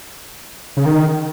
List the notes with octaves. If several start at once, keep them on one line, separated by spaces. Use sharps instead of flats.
C#3
D#3